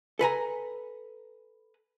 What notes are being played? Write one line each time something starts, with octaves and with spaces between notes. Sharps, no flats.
A4 B4 G#5 A#5